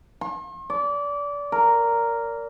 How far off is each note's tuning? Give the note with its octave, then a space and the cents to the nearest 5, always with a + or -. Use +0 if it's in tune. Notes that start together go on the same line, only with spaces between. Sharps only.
C6 +45
D5 -25
A#4 -5